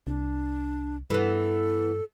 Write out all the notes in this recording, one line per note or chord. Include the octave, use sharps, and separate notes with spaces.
C2 D4
G2 E3 B3 A4